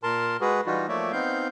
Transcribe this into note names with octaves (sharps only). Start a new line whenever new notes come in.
A#2 A#4 A5 C6
G#3 F#4 G#4 B4
E3 G3 D#4 F4 F#4
F3 A3 A#3 C#5 D5 E5
B3 C4 D#4 F5 G6